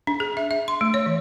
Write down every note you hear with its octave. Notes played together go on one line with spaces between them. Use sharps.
D4
G#4
E5
E5
C6
A3
C#5
E3